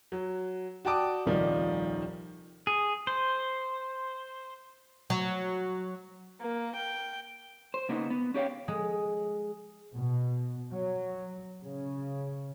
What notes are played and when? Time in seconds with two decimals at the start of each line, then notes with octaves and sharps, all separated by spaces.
0.12 F#3
0.85 F#4 D5 G5 A5 D6 D#6
1.26 D#1 C2 D#3 F3 D#4 D5
2.67 G#4
3.07 C5
5.10 F#3
6.40 A#3
6.76 G5
7.74 C5
7.89 C#3 A#3 B3 D#4
8.10 B3
8.34 C#4 G4 C#5 F5 G5
8.68 G#3
9.95 B2
10.72 F#3
11.62 C#3